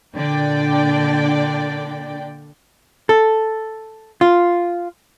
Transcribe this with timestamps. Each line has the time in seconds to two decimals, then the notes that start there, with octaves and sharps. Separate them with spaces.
0.17 A#2 D3 D4 D5 G5
3.09 A4
4.21 F4